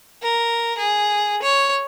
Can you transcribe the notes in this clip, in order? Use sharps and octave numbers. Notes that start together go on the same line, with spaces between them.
A#4
G#4
C#5